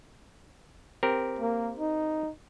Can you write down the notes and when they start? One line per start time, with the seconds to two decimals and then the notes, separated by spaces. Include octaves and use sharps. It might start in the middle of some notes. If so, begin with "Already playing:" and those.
1.03 C4 G4 A#4
1.39 A#3
1.79 D#4